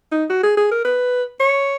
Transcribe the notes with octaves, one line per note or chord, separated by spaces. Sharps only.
D#4
F#4
G#4
G#4
A#4
B4
C#5